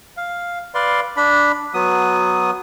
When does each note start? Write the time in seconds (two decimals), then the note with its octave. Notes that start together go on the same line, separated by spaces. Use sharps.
0.17 F5
0.74 B4 D5 F5 C6
1.16 D4 B5
1.74 F#3 B3 D#6